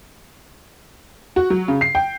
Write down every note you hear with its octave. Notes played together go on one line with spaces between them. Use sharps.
F#4
F#3
C#3
C7
G5